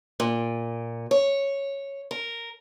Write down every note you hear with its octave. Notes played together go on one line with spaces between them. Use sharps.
A#2
C#5
A#4